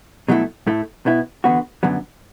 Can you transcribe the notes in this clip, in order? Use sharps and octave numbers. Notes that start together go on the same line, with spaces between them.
B2 F#3 A3 E4
A2 A3 E4
B2 B3 E4
E2 D3 B3 F#4
F#2 D3 F#3 B3